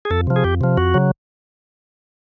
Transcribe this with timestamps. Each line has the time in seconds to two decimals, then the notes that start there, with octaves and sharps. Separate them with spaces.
0.05 G#4
0.11 F2 A4
0.27 C3 F3
0.36 G#4
0.44 F2 G4
0.61 C3 F3
0.77 F2 F#4
0.94 C#3 F#3